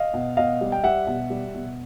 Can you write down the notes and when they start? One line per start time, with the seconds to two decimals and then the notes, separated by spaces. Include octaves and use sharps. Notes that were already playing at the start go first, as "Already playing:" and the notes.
Already playing: D#5 F5
0.14 B2
0.37 B2 D#5 F5
0.61 G3
0.72 G5
0.83 G3 E5 F#5
1.07 B2
1.30 G3
1.54 B2